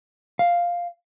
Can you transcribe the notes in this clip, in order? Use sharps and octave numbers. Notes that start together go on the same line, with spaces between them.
F5